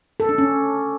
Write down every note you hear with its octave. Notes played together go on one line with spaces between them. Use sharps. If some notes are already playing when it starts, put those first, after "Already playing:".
A4
D4
C#4